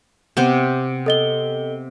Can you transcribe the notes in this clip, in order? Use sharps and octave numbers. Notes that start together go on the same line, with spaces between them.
C3 B3 C5
A4 D#5 G7